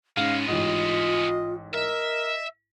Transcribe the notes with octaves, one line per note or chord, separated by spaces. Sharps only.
G#2 G#3 B3 C#4 F5
A1 G#2 F4 D#5
A#4 D#5 E5